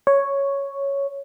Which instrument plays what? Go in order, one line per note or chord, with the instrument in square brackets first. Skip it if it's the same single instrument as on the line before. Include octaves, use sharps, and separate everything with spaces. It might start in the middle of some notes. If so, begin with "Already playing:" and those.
[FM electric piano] C#5